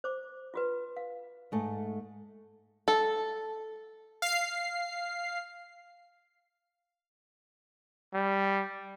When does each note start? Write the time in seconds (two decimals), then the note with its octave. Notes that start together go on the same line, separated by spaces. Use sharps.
0.04 C5 D6
0.54 F4 F#4 B4
0.97 F5
1.52 G#2 A3
2.88 A4
4.22 F5 C7
8.14 G3